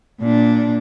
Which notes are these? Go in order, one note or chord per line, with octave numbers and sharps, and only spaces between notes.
A#2 D4